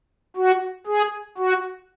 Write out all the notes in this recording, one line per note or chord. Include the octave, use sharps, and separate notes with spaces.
F#4
G#4
F#4